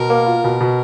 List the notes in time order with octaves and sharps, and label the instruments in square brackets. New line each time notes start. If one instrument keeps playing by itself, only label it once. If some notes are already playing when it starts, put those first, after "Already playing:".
Already playing: [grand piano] B2 [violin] A#4
[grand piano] A#3
F4
B2
B2